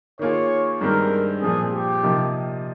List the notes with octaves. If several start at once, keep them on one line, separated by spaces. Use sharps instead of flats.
D#3 A#3 F4 G#4 C#5
G2 D#3 G#3 C4 G4 A#4
A#2 F3 C4 G#4
G4
C3 F3 A#3 D#4